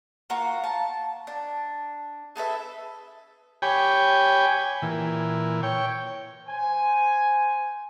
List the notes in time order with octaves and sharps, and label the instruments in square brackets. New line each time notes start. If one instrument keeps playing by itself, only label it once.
[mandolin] A#3 F4 F#4 A#5
A5
D4
G#4 A4 B4 E5
[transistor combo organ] G4 C#5 G5 G#5 B5
A#2 E3
C#5 G5
[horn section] C5 G#5